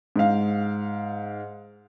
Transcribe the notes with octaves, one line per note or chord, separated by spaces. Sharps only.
G#2 F5